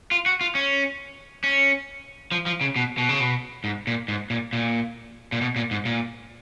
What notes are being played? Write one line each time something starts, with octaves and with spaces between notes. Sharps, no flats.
F4
F#4
F4
C#4
C#4
F3
F3
C#3
B2
B2
C#3
B2
G#2
A#2
G#2
A#2
A#2
A#2
B2
A#2
G#2
A#2